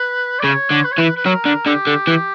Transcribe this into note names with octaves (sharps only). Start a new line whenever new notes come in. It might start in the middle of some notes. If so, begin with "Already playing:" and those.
Already playing: B4
D5
C#3 C#5
D3
B4
C#5
E3 B4
B4
F#3 A#4
D3
D3 G4
D3
E3